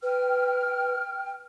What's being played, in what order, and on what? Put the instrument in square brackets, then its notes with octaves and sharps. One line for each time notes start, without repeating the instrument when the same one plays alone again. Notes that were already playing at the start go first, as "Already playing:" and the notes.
[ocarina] B4 [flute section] G5 F6